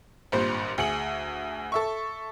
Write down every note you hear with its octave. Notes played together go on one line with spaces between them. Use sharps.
G#1 G2 A#2 C5
D2 G#4 C#7 F#7
A4 E5 C#6